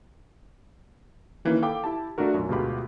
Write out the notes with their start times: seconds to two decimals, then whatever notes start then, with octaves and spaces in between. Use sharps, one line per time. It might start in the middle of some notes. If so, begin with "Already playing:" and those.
1.45 D#3 E3 A#3 C#4 E4
1.62 A4 F5 G5 B5 D6
1.84 E4 G4 A5
2.18 A3 D4 F4 F#4 A#4
2.34 B1 F#2
2.49 D2 B2 G#3 F4 G4 B5